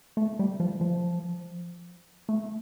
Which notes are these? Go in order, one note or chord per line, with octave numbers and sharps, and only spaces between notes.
A3
G3
F3
F3
A3